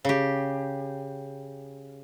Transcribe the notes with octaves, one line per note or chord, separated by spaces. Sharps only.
C#3 G4